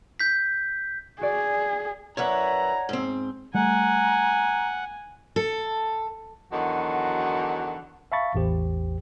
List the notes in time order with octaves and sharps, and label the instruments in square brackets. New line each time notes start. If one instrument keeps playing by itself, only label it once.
[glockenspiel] G6 B6
[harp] F#4 D5 [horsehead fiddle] G#4
[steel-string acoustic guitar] F#2 E4 B4 [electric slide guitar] C#5 D5 F#5 [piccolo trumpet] A#5
[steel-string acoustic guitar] G#2 C4
[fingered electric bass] G3 A3 [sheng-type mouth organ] F#5 [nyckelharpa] G#5 [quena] A#5
[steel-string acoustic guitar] A4
[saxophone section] E2 D3 D#3 F#3 F#4 F#5
[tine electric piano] E5 F5 A5 B5 C#6 A6
A1 E2 G4 C5